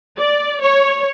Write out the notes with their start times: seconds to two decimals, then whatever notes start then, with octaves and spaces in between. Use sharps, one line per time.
0.17 D5
0.61 C#5